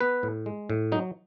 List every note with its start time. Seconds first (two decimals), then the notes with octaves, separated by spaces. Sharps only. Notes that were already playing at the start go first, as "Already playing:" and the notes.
0.01 B3 B4
0.23 A2
0.46 G#3
0.70 A2
0.92 F#3 D#4